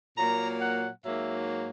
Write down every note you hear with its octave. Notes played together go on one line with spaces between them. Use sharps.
A#2 F#3 A#3 A#5
F#5
G#2 F#3 A#3 E5